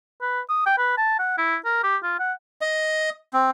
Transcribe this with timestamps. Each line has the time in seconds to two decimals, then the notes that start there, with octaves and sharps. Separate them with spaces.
0.21 B4
0.49 D#6
0.66 G5
0.78 B4
0.98 A5
1.19 F#5
1.38 E4
1.65 A#4
1.84 G4
2.03 F4
2.20 F#5
2.61 D#5
3.33 C4